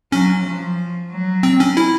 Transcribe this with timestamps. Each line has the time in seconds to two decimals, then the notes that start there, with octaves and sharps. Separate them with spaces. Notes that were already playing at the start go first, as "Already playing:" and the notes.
0.12 F#3 C#4
0.45 F3
1.10 F#3
1.43 C4
1.60 C#4
1.77 E4